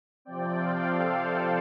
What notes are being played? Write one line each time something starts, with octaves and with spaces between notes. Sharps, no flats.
C3 F3 C4 D5 G5
C5 F5
A4 D5
C5